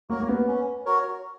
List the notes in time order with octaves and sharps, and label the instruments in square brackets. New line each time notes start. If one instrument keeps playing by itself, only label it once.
[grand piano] A#3 [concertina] F#4 A#4 C#5
[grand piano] A#3
B3
[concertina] C#4
F#4 A#4 C#5